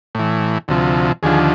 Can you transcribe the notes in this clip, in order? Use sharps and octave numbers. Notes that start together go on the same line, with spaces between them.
A2 E3
D2 C3 F3
D#2 D3 F3 G#4